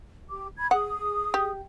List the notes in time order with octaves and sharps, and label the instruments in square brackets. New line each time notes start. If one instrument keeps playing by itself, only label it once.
[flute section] G4 D6
B5 G#6
[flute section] G#4 D#6 [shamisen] F#5
[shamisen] G4